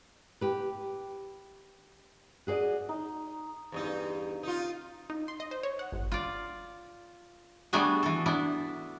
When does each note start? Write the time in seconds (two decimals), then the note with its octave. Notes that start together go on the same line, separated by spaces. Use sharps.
0.41 G4 B4
2.47 F#4 G#4 C5 D5 D#5
2.89 D#4
3.72 E2 G2 D#4
4.43 D#4 F4
5.10 D#4
5.28 C6
5.40 D#5
5.51 C5
5.63 C#5
5.79 F#5
5.92 G1
6.12 F4 D5
7.73 G3 A3 B3 D4 F#4 G#4
8.03 E3 A4
8.26 B3 D4 E4